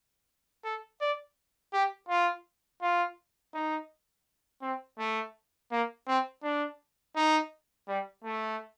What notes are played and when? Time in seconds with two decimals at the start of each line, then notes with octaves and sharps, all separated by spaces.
0.64 A4
1.01 D5
1.73 G4
2.09 F4
2.82 F4
3.54 D#4
4.62 C4
4.99 A3
5.71 A#3
6.08 C4
6.43 D4
7.16 D#4
7.88 G3
8.24 A3